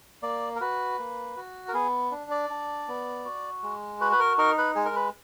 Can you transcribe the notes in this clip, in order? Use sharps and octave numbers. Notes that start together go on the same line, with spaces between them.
A#3 D5
A#4
F#4 B4
A#3
F#4
A#4
B3 G#4
D4
D5
D4
B3
F#4
G#3
F#4 B4
B4
A#4
D#4 A#4
B4
G#3 G#4
A#4
B4